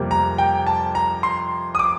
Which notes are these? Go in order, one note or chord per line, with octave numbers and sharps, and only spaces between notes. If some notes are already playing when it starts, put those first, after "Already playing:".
Already playing: F2 C3 G3 A#3
A#5
G5
A5
A#5
C6
D#6
D6